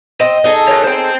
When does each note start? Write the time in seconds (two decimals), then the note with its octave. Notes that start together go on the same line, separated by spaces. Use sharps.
0.21 C4 D#5
0.44 D#4 G#4 A4
0.68 A#4 C#5
0.84 C5 G5